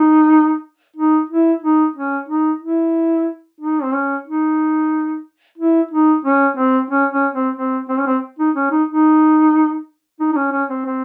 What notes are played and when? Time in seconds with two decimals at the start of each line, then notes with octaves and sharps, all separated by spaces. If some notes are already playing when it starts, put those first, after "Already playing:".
Already playing: D#4
0.96 D#4
1.30 E4
1.63 D#4
1.96 C#4
2.29 D#4
2.62 E4
3.61 D#4
3.83 C4
3.94 C#4
4.27 D#4
5.58 E4
5.91 D#4
6.25 C#4
6.57 C4
6.90 C#4
7.12 C#4
7.34 C4
7.56 C4
7.89 C4
7.98 C#4
8.07 C4
8.39 D#4
8.56 C#4
8.72 D#4
8.88 D#4
10.20 D#4
10.32 D#4
10.36 C#4
10.52 C#4
10.70 C4
10.86 C4